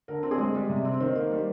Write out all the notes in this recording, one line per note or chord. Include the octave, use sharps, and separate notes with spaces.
D3 A#4
C4
G#4
G#3
G3
C3
C4
D#3 C5
A#3
G3